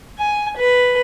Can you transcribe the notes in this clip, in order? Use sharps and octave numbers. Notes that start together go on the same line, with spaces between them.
G#5
B4